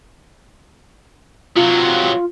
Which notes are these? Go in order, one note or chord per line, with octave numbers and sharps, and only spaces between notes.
C3 F#3 F4